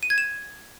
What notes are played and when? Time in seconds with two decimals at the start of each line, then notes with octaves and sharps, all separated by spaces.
0.03 D#7
0.10 G#6
0.18 E7